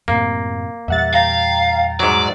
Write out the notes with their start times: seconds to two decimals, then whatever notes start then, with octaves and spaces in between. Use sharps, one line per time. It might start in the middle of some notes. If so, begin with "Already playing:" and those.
0.08 F#2 A2 C3 A#3
0.88 E2 A#2 G3 E5 F#5 A6
1.14 F5 G5 A#5 A6
2.00 G#2 F#3 D5